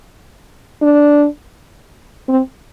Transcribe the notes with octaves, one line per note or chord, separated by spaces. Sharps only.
D4
C4